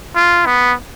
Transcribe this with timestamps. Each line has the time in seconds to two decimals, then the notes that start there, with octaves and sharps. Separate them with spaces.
0.16 F4
0.46 B3